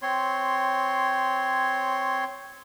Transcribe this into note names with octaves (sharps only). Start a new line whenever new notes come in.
C4 C#5 C6